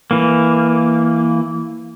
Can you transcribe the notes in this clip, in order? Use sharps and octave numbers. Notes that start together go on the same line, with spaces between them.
E3 A#3